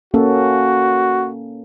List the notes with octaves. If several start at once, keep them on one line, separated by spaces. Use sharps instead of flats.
A#3 C#4 F#4 A4